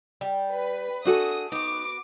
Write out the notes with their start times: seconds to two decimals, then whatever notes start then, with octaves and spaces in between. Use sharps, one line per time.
0.21 G3
0.51 B4
1.05 A3 D4 F#4 G#4 A4 D#6
1.52 B3 D#4 F#4 D6